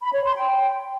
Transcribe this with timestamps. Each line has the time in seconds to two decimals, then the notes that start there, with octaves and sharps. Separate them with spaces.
0.01 B5
0.13 C#5
0.24 C6
0.36 G5